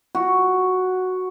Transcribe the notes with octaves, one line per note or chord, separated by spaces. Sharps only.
F#4